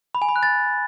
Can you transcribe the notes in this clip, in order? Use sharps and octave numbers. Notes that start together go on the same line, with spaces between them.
B5
G#5
B5
F#6
A6